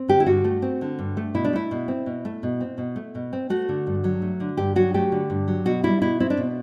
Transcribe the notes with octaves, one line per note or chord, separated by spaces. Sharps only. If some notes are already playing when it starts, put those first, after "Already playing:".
Already playing: C4
D3 G4
E4
G2 F#4
A3
C4
D3
G2
A3
B2 E4
D4
A3 E4
B2
C4
B2
A3
B2
C4
B2
A3
B2
C4
A3 F#4
D3
G2
F#3
A3
D3
G2 G4
F#3 F#4
A3 G4
D3
G2
F#3
B2 F#4
G3 E4
B2 E4
C4 E4
D4
B2